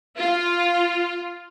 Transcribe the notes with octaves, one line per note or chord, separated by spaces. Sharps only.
F4